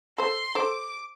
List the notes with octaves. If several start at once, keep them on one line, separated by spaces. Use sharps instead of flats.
A4 C5 C6
A4 C5 D6